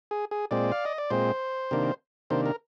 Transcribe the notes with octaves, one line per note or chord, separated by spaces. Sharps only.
G#4
G#4
A#2 G#3 C4 D5
F5
D#5
D5
A#2 G#3 C4 C5
C3 D#3 A#3 D4
C3 D#3 A#3 D4 C5
A#4